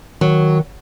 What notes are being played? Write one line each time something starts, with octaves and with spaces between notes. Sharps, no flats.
D#3 F#3